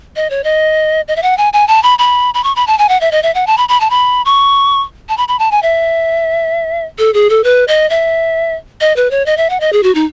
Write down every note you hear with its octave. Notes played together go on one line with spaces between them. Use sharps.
D#5
C#5
D#5
D#5
E5
F#5
G#5
G#5
A5
B5
B5
B5
C#6
B5
A5
G#5
F#5
E5
D#5
E5
F#5
A5
B5
B5
A5
B5
C#6
A5
B5
B5
A5
G#5
E5
A4
G#4
A4
B4
D#5
E5
D#5
B4
C#5
D#5
E5
F#5
D#5
G#4
F#4
D#4